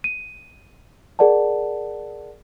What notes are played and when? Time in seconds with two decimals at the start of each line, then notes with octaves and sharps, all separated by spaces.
0.04 D#7
1.19 G#4 A#4 D5 F#5 A5